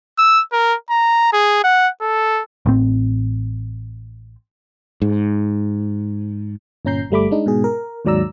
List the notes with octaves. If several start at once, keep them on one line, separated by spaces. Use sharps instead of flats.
E6
A#4
A#5
G#4
F#5
A4
A1 A2 C4
G#2
G1 A#2 C#4 A#5 G6 C7
G1 G3 A3 B5 D6
G#3 D4 D#4
G#2 B2 G#4
A#4
D#2 G#2 F#3 D5 A#5 E6